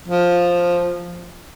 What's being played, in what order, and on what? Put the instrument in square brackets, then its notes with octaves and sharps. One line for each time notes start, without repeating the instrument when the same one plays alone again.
[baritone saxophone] F3